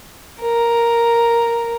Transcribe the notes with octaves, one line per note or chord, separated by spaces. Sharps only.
A#4